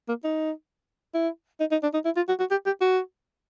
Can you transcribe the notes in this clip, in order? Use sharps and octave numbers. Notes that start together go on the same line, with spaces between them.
A#3
D#4
E4
D#4
D#4
D4
D#4
E4
F4
F#4
F#4
G4
G4
F#4